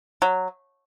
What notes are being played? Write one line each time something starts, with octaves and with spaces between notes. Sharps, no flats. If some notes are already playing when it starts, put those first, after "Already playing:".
F#3